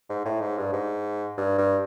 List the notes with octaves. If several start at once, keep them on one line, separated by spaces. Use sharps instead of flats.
G#2
A2
G#2
G2
G#2
G2
G2